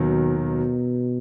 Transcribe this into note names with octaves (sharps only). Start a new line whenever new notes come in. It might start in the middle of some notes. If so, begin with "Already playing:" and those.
Already playing: D#2 B2 D#3 F#3
B2